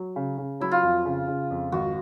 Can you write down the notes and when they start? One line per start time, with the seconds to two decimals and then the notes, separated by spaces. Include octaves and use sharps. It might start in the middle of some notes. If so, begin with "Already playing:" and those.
Already playing: F#3
0.16 C#3
0.38 C#3
0.60 F#3 E4
0.72 F4
0.83 F2
1.05 C#3
1.28 C#3
1.50 F2
1.72 G#1 F#4